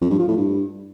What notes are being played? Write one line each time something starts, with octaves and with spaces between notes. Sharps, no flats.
F2
G2
F3
A2
G2